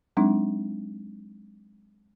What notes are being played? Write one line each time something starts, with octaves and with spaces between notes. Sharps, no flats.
F#3 G#3 C4 D4 D#4